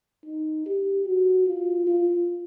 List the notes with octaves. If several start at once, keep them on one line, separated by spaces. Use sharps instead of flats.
D#4
G4
F#4
F4
F4